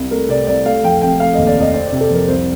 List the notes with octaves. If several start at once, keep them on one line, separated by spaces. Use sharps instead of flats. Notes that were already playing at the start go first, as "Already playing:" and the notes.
Already playing: C2
A3 A#4
C3 D5
C2 D5
A3 F5
F2 G5
F1 G5
A3 F5
D#2 D#5
D5
F1 D#5
C4 D5
C3 D5
A4
F2 A#4
C2 C5